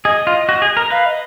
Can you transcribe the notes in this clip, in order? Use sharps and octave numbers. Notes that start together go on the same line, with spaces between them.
G#4 D#5
F4
F#4
G#4
A#4
B4 F5
D#5